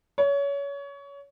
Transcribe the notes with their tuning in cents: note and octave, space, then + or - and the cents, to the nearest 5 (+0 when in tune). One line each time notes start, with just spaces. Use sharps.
C#5 +25